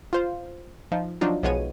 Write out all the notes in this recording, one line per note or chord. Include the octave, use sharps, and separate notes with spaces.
F4 C5 F5
F3 D#4
F3 F#3 D4 D#4 F4
B1 F3 G#3 B3 C#5 D#7